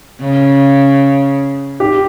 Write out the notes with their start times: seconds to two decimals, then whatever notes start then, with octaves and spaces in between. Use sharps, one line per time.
0.21 C#3
1.80 G4